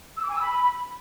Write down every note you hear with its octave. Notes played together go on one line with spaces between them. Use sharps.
E6
D6
G#5
E6
B5